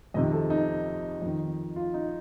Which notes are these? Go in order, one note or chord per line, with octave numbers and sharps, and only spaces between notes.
F2 C3 D#3 D#5
A4
D#4
F2 D#3
F4
D#4